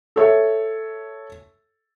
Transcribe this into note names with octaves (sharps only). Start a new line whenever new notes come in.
A4 C#5 E5